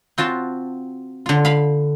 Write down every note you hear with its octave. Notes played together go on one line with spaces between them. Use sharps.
C4 F4 F#4 A5
D3 F4
F5 B5